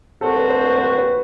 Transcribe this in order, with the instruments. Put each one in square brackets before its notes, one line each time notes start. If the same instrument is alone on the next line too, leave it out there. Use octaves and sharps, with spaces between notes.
[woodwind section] C2 C3 F#3 C4 F#4 [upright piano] A4
[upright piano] B4
C5
B4
B4
B4